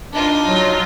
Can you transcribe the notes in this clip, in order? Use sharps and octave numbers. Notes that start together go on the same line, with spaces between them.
D4 D#4 F4
F#3